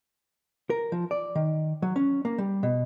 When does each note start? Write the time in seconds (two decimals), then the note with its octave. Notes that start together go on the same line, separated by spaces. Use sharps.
0.70 A#4
0.92 F3
1.11 D5
1.35 D#3
1.82 F#3
1.96 C#4
2.25 A#3
2.38 G3
2.63 B2